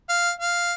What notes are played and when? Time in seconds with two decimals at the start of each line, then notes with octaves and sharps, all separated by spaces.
0.09 F5
0.40 F5